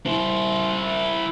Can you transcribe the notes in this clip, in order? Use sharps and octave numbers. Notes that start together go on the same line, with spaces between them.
E4 C5